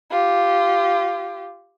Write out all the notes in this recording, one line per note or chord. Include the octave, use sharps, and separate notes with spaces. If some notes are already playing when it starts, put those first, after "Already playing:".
F4 G4